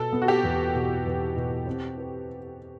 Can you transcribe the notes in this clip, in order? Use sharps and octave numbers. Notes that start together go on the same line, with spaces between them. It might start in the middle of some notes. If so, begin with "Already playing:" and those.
Already playing: B2 A4
B3
F#4
G4
E2
B2
E2
B2
C4
B4